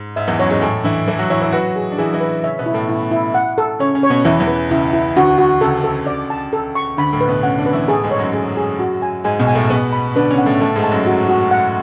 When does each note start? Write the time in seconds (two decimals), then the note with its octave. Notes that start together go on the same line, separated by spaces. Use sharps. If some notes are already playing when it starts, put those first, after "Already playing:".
Already playing: G#2
0.16 G#2 E5
0.28 E2 E3
0.39 F#2 F#3 C#5
0.51 G#2 G#3
0.62 A2 A3 G#5
0.84 E3 D4 E4
1.08 E3 E4 A4
1.19 F#3 F#4
1.30 E3 E4 C#5
1.41 E3 E4
1.52 F#3 F#4 B4
1.76 G#4
1.92 D4
1.98 E3 E4 G#4
2.13 E3 E4
2.21 B4
2.44 C#3 C#4 E5
2.59 B2 B3
2.66 E4
2.74 A2 A3
2.89 E4
3.11 E4
3.34 F#5
3.58 A4
3.79 C#3 C#4 C#5
3.95 C#3 C#4
4.03 C#5
4.10 B2 B3
4.25 E2 E3 E4
4.40 E2 E3
4.48 B4
4.71 C#2 C#3 E4
4.94 E4
5.17 D2 D3 F#4
5.38 F#4
5.61 C#2 C#3 A4
5.84 A4
6.07 D5
6.30 A5
6.53 A4
6.75 C#6
6.97 D2 D3 B5
7.12 A2 A3
7.21 B4
7.28 B2 B3
7.43 C#3 C#4 F#5
7.58 D3 D4
7.66 B4
7.73 E3 E4
7.88 A2 A3 G#4
8.04 G#2 G#3
8.11 C#5
8.19 F#2 F#3
8.34 G#4
8.57 G#4
8.79 F#4
9.02 G#5
9.24 G#2 G#3 G#5
9.40 B1 B2
9.47 G#5
9.55 A2 A3
9.70 B2 B3 G#4
9.93 B5
10.15 D3 D4 B4
10.30 C#3 C#4
10.38 F#5
10.46 A2 A3
10.60 A2 A3 A5
10.76 G#2 G#3
10.84 A5
10.91 F#2 F#3
11.07 F#4
11.29 F#4
11.51 F#5